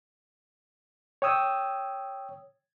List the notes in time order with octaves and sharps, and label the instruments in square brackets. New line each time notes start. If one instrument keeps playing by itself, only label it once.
[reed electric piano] C#5 G5 D#6 E6